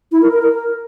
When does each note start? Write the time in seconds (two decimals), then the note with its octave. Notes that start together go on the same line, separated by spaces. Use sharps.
0.12 E4
0.22 A#4
0.33 A#4
0.43 A#4